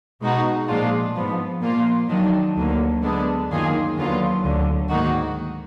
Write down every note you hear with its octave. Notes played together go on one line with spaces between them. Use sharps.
B2 G#3 D#4 F#4
A#2 F3 G#3 D4 F4
G#2 F3 B3
A#2 F3 A#3 F4
D#3 F#3 D4
D2 D3 F#3 A#3
D3 G#3 B3 D4
F#2 D#3 A#3 F4 G#4
D#2 D3 F#3 B3 F4
D2 D3 F#3
G#2 D#3 A#3 D#4 F#4